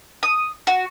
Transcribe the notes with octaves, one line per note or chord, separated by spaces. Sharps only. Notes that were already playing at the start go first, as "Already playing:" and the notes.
D#6
F#4